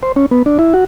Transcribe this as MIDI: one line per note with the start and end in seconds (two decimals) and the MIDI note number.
0.03 0.12 72
0.16 0.26 61
0.31 0.43 59
0.46 0.58 62
0.59 0.74 64
0.74 0.84 66